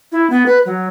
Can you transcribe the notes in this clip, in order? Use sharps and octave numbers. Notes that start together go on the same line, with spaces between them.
E4
B3
B4
F#3